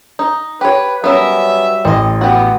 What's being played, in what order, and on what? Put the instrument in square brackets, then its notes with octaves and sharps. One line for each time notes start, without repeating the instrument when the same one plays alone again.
[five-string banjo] D#4
[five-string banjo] G4 C#5 [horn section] B4
[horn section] F#3 G3 E5 [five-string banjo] B3 C#4 A#4
[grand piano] A1 [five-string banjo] C4 D#5
[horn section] B3 [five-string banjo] F#4 G4